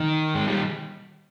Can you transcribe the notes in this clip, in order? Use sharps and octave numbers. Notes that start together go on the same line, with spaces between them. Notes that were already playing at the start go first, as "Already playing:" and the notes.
Already playing: D#3
G#3
G3